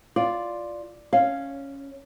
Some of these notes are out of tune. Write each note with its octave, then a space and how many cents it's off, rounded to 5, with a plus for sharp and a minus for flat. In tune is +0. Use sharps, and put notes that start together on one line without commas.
F4 +0 D5 +0
C#4 +0 F5 +0